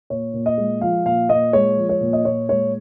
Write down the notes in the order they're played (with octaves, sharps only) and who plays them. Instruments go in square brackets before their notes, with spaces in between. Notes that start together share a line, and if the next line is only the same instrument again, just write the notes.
[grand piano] A#2 C#5
A#2
D#5
G#3
F3 F5
A#2 F5
A#2 D#5
G#3 C#5
F3
C#5
A#2
D#5
A#2 C#5
G#3 C#5